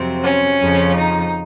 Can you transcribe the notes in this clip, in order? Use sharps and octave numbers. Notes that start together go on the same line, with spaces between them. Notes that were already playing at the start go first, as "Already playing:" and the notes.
Already playing: F2 C3 F#3 C4
C#4
F2 C#3 F3
D#4